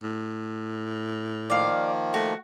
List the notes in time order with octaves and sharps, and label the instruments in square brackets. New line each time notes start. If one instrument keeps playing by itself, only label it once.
[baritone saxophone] A2
[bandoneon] D#3 F3 A#3 [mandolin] D5 F5
[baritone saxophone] A3 [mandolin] F#4